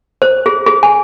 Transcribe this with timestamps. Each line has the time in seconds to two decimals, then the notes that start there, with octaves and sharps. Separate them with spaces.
0.22 C5
0.46 G#4
0.66 G#4
0.83 G#5